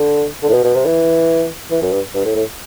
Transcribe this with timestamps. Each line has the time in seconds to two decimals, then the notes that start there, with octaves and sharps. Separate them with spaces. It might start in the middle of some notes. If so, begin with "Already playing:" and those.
Already playing: D3
0.43 D3
0.49 A2
0.54 B2
0.64 B2
0.74 C3
0.85 E3
1.71 E3
1.82 F#2
1.92 G2
2.14 G2
2.25 A2
2.35 A2